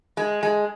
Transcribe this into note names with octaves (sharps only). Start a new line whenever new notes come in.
G#3
G#3